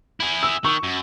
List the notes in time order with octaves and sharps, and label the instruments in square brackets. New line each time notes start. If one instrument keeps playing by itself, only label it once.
[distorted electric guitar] E4 G#4
[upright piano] E6
[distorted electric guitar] D#3 [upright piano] C#6
[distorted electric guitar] F#2